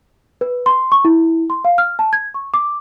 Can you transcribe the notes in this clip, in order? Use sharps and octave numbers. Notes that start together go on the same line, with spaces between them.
B4
C6
C#6
E4
C6
F5
F6
A5
G#6
C#6
D6